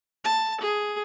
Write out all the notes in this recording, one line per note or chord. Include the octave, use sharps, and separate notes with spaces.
A5
G#4